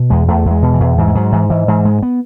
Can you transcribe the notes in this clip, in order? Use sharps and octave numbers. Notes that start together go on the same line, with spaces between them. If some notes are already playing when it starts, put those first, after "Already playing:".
Already playing: B2
E2 G#3
E2 A3
E2
G#3
B2
E3
E2
G#2 E3
G#3
G#2 F#3
G#2 E3
G#2 E3
G#2 E3
G#2 G#3
B3